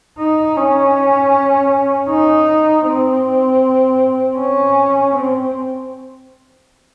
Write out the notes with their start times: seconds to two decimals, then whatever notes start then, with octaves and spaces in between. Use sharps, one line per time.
0.19 D#4
0.57 C#4
2.09 D#4
2.86 C4
4.39 C#4
5.15 C4